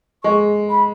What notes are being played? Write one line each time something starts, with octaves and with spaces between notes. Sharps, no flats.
G#3 C#6
B5